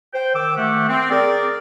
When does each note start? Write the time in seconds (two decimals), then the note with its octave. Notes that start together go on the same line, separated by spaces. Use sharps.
0.14 C5 G5
0.35 D#3 D6 E6
0.57 D#3 A3 G4 E5 F#5
0.89 C4
1.10 G#4 A#4 D5